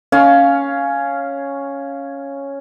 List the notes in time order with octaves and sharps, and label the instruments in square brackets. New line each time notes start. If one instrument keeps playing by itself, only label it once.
[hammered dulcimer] C#4 F5